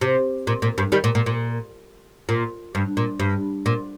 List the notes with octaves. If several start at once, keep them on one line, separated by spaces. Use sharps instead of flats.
C3
A#2
A#2
G2
D#3 G3
A#2
A#2
A#2
A#2
G2
A#2
G2
A#2